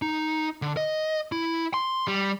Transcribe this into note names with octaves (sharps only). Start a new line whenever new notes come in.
D#4
D3
D#5
E4
C6
G3